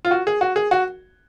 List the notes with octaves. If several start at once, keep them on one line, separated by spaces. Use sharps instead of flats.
F4
F#4
G#4
F#4
G#4
F#4